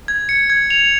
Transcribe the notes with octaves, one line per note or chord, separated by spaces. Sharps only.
G#6
C#7
G#6
F7